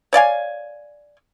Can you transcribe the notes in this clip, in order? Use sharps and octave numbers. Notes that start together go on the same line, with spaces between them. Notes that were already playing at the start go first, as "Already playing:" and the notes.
C#5 D5 F5 G#5